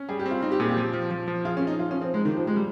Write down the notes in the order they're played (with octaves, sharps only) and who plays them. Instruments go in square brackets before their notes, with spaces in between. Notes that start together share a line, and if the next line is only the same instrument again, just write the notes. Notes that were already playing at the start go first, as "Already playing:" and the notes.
Already playing: [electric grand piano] C#4
[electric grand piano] G3 [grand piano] G#4
[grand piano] G4
[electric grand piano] C4
[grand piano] F4
[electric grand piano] C4 [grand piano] D#4
[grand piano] G4
[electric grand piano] A#2 [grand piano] G#4
[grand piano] G4
[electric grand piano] F3
F3
F3
F3
[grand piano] F4 [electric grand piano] G#4
[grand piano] C#4
[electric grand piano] F3
[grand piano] D#4
[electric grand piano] F3 [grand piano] F4
[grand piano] C#4
[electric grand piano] F3
[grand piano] C4
[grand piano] G#3 [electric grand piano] D#4
[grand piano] D#3
[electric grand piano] G4
[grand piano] F3
[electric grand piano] F3 [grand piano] G#3
[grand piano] G3